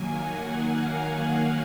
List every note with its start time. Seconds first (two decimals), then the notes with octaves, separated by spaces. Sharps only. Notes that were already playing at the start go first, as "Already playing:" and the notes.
Already playing: D#3 F#3 A#3 G#5
0.11 F#5
0.58 F5